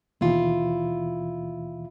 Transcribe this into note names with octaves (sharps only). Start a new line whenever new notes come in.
D#2 B2 E3 E4 F4